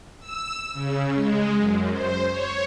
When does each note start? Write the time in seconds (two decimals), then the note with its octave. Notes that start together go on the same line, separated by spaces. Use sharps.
0.20 E6
0.73 C#3
1.15 G#3
1.57 F#2
1.92 C5
2.30 C#5